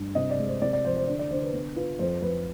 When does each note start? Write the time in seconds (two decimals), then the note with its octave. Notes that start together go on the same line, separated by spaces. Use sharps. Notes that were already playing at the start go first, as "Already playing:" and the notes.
Already playing: G2
0.15 C3 D#5
0.30 D5
0.39 G#3
0.47 C5
0.62 C3 D5
0.73 D5
0.84 F3 C5
0.97 C5
1.07 D3 D5
1.19 D5
1.31 D3 C5
1.42 B4
1.53 B3
1.76 F4 B4
1.99 F2 C5
2.22 F2 B4